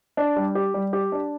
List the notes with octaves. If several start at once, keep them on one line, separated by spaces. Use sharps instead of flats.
D4
G3
G4
G3
G4
D4